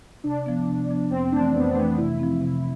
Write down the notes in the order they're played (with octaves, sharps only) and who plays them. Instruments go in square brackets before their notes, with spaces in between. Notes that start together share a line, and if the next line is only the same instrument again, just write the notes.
[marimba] C3 [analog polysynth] D4
[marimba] F3 B3
C3
F3 B3
[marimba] F2 [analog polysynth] C4
[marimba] E3 A3 [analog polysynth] D4
[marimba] F2 [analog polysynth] B3
[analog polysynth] C4
[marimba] E3 A3 [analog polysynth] B3
[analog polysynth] D4
[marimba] C3 [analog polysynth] E4
[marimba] F3 C4
C3